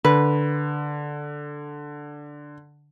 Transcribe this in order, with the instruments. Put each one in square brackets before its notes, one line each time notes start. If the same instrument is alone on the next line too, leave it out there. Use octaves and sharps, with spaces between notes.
[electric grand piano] D3 [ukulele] B4